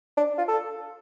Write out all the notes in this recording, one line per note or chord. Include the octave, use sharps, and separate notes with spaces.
D4
F4
A4